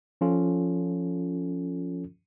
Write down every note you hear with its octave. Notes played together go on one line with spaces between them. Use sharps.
F3 C#4 F4 A4